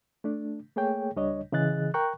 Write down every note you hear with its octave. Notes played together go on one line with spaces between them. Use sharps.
A3 D4
A3 A#3 G#4 C#5 G5
C#2 G3 D4 C#5 D#5
C#3 E3 G#4 D#5 F#6 A6
A#4 G5 A#5 C#6 F#6